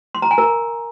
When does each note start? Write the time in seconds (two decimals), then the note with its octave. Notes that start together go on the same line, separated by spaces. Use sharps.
0.15 C6
0.22 A#5
0.31 G#5
0.38 A#4 A#5